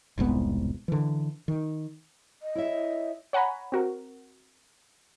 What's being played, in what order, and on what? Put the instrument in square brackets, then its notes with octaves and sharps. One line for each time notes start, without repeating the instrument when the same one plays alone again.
[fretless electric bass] E1 C2 G#2 B3
D3 E3
D#3
[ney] D#5
[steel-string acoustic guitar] E4 C#5 E5
[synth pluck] C#5 F#5 G#5 A#5 B5
C4 F#4 A#4